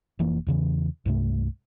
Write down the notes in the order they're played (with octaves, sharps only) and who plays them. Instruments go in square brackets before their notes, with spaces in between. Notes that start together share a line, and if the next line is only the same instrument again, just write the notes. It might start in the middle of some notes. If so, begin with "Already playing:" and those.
[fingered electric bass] F1 E3 A#3
E2 C#3 E3
C2 G2 C3 A3